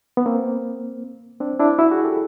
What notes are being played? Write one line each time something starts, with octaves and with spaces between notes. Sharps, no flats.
B3
A#3 C4
C4 D4
D4 E4
E4 F#4
F#4 G#4
G4 A4